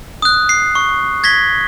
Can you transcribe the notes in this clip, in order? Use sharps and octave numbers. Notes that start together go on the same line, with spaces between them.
D#6 F#6
C7
C#6
G#6 A#6 B6 G7